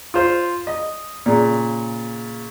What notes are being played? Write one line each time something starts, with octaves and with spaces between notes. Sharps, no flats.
F4 C5
D#5
A#2 C#3